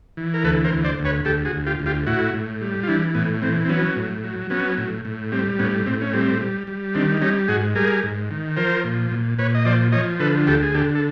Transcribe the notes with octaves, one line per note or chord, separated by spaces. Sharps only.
E3
A#4
D2 A4 B4
A#4 C5
D2
C5 D5
D2
B4 C#5
D2 G4 A4
F#4 G#4
D2
F4 G4
D2
F4 G4
A2 E4 F#4
A2
G3
F4
E3 D4 E4
A2 B3
E3 C4
C4
F#3 B3 C#4
A2
F#3
F#3 B3 C#4
A2
A2
G3 C4
A2 B3 C#4
A2 C4
C#4
G3 C4
G3
G3
D#3 C4 D4
G3 C#4 D#4
G#2 F#4 G#4
G3 G#4 A#4
G#2
D#3
F3 A#4 C5
A#2
A#2
A#2 B4 C#5
D#5
F3 C5 D5
F3 C#5 D#5
D3 A4 B4
D2 G4 A4
G#4
D3 G4 A4
A4